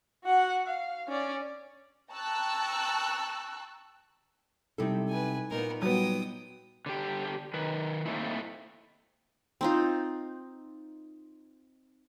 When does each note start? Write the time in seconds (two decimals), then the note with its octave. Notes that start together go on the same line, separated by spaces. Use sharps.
0.25 F#4 F#5
0.67 F5
1.08 C#4 D5
2.11 G5 A5 A#5 C#6 E6 F#6
4.78 C3 G3 D#4 E4 A4
5.09 B4 G#5
5.51 A#2 B3 D#4 A#4
5.82 F#3 G3 B3 G5 D#6
6.86 D3 G4
7.54 D#3 B4
8.05 A3 A#3 C4 D#4 E4
9.61 C4 D#4 F4